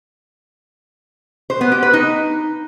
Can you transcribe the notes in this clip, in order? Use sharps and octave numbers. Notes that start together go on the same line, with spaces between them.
C5
B3
G4
B4
D#4